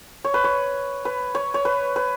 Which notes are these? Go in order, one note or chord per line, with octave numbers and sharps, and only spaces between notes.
C#5
B4
C#5
B4
C#5
C#5
B4
B4